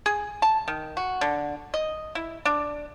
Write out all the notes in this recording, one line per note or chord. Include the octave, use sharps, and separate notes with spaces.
G#4
A5
D#3
F#4
D3
D#5
E4
D4